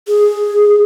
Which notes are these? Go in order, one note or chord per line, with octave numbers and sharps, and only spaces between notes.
G#4